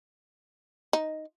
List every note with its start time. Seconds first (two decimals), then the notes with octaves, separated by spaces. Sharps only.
0.93 D#4